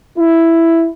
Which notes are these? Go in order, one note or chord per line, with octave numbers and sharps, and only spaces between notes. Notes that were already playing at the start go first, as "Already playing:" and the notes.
E4